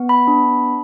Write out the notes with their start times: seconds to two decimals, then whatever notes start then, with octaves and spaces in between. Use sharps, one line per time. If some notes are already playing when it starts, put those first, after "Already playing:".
Already playing: B3
0.09 B5
0.28 D4